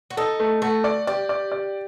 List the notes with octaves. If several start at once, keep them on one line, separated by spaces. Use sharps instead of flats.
F#4
D#4 A4
A3
A3 F#4
D5
G4 D5
D5
D5